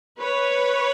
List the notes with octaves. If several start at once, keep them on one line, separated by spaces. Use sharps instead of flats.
B4 C#5